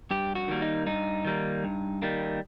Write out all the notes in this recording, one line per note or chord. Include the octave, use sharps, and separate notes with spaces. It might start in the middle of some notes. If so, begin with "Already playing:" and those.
G2 G4
F#4
D#3 G3 A#3
D#4
G2 D#4
D#3 G3 A#3
G2
D#3 G3 A#3